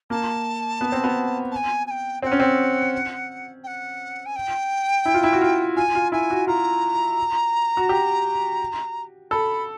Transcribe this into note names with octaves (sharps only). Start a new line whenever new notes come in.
A#3 A5
B3
C4
B3
A5
G#5
G#5
G5
C4 G5
F#5
C#4
C4
G5
F#5
G#5
G5
E4
F4
E4
F#4
F4
F4 G#5
F4
E4 G#5
F#4
F4 A#5
F#4
G4
A4 B5